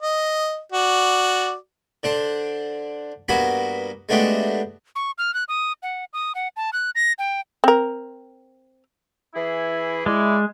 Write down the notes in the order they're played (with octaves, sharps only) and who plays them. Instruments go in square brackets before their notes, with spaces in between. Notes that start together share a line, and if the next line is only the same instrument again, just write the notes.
[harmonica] D#5
F#4 D5
[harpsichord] D3 D4 C5
G2 A#3 B3 F#4 G#5 B5
G#3 A3 B3 D4 F#4 G4
[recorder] C#6
F6
F#6
D#6
F#5
D#6
F#5
A5
F#6
A#6
G5
[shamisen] C4 A#4
[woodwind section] E3 E4 G#4
[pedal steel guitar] G#3 [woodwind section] E4 D5